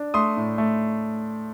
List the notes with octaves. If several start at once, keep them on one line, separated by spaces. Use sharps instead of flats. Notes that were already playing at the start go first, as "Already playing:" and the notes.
Already playing: D4
A3 C6 D#6
A2
A3